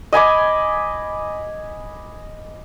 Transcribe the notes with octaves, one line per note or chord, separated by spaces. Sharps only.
D#5 G#5 B5 D6